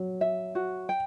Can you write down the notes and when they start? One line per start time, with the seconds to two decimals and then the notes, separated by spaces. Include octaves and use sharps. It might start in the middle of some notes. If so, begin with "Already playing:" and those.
Already playing: F#3
0.21 E5
0.55 F#4
0.89 G5